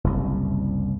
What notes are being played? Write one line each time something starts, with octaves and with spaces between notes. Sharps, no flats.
F#1 C2